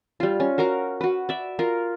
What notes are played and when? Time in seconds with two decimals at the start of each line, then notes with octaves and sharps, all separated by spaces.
0.20 G3 F4
0.40 C#4
0.58 F#4 A#4 F5 A#5
1.01 F#4 B4
1.29 D5 E5
1.59 F4 A#4